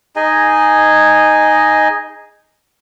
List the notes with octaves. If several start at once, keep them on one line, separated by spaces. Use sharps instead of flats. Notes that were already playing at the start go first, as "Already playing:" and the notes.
D#4 G#4 D#5 G#5